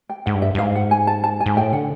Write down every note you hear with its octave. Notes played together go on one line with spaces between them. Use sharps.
G5
G#2 F#5
G2
E5
G2
G#2 F5
F#5
G#5
A5
A5
G#5
G#2
A2 G5
D3 F#5